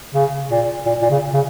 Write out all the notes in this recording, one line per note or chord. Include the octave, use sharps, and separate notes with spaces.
C#3
A#2
A#2
A#2
C#3
C#3